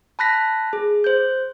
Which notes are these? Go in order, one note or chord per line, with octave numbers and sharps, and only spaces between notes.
A5 B5 F#6 A#6 B6
G#4
C5 G6